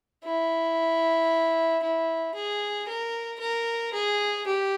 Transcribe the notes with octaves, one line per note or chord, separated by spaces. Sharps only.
E4
E4
G#4
A#4
A#4
G#4
G4